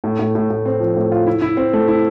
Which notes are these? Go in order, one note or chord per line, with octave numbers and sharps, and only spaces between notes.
A2
A2
A2
A2
C4
F3
A2
F4
E4
E4
C4
A3
E4